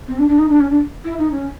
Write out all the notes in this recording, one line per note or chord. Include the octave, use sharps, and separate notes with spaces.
C4
D4
D4
D#4
D4
C#4
D4
E4
D#4
C#4